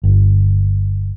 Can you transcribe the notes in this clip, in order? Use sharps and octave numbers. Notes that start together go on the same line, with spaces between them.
G1